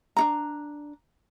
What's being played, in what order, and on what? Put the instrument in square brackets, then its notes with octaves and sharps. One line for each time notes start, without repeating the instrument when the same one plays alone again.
[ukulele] D4 D#4 A#5